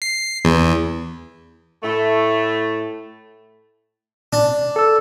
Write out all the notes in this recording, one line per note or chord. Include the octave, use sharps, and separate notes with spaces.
C7
E2
A2 A3
D4
A4 E6